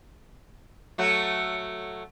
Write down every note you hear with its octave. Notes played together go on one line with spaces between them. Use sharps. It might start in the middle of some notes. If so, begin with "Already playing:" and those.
F#3 A3 F#4